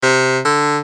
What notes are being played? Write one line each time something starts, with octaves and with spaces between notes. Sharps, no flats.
C3
D3